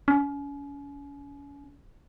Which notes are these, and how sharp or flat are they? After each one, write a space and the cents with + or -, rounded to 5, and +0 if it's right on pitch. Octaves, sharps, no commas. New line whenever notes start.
C#4 +35